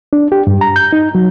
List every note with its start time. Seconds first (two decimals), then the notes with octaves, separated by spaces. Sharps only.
0.13 D4
0.32 G4
0.47 G2
0.61 A#5
0.76 G6
0.93 D#4
1.15 F#3